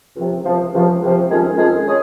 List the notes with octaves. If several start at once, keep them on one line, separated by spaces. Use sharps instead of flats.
C#2 C3 F3
C#2 C3 F3
C#2 C3 F3
C#2 C3 F3
F2 D#3 G#3 C#4 G#4
F2 D#3 G#3 C#4 G#4
G#3 C#4 G#4